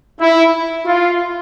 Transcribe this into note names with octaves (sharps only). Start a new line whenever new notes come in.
E4
F4